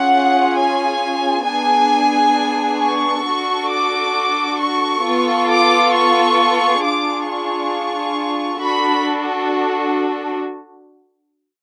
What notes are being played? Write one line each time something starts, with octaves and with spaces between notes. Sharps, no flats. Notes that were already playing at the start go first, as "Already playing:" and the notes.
Already playing: C#4 F4 G#4 F#5
G#5
B3 D4 G#4 G#5
C#6
D4 F#4 A4
D6
C#6
B3 F4 A4
D6
C#6
D4 F4 G#4 D6
C#6
D4 F#4 A4 B5